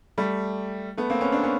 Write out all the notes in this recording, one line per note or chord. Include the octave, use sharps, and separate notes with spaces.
G3 A3
A3 B3
A#3 C4
B3 C#4
C4 D4
B3 C#4